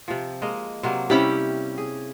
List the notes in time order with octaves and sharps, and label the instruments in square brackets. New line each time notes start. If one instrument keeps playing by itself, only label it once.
[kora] C3 F3
G#3 A#3 D#5
[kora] C3 F#3 A#3 [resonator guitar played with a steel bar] C5
[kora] C3 G3 [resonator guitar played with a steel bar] C#4 E4 G4
[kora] G#4